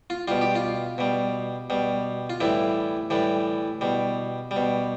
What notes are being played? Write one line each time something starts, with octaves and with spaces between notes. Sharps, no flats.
F4
B2 G3 F4
G4
F4
B2 G3
B2 G3
F4
A2 E3 G3 E4
A2 E3 G3
B2 G3
G3
B2